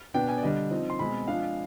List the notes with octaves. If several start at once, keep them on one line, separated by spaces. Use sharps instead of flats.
B2 B3 D4 G5
G#5
D5
D3 G3 D4 D#5
F3 C4 D#4
C6
B2 G#3 C4 B5
F3 G#3 D4 F5